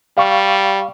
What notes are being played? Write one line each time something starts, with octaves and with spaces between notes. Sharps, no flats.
G3 F5 C#6